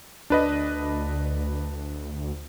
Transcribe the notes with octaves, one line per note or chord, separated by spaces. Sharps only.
D2 D4 B4 D#5